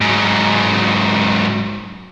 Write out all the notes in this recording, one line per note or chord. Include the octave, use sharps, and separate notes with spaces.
G#2 F#3